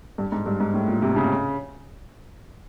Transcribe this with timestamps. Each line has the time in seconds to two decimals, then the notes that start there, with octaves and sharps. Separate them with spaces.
0.18 G2
0.32 G#2
0.46 G2
0.60 G#2
0.74 A2
0.88 A#2
1.02 C3
1.16 C#3